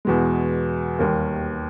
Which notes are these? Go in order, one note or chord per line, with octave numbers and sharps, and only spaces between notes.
E2 B2 G#3
D#2 D#3 G3 A#3